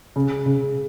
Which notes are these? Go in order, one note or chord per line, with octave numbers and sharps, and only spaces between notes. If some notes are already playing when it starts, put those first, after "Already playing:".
C#3
C#3